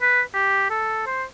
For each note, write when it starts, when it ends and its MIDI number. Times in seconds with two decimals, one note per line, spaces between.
0.02 0.21 71
0.34 0.69 67
0.70 1.06 69
1.06 1.24 72